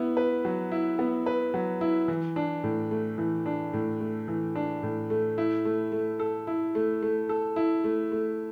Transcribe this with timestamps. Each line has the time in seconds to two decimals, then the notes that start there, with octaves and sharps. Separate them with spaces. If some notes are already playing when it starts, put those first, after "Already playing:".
Already playing: B3 E4
0.17 B4
0.45 F#3
0.72 E4
0.99 B3
1.26 B4
1.54 F#3
1.81 E4
2.08 E3
2.36 D4
2.63 A2
2.91 A3
3.18 E3
3.46 D4
3.73 A2
4.00 A3
4.28 E3
4.56 D4
4.83 A2
5.10 A3
5.38 E4
5.65 A3
5.92 A3
6.20 A4
6.47 E4
6.75 A3
7.02 A3
7.29 A4
7.56 E4
7.84 A3
8.12 A3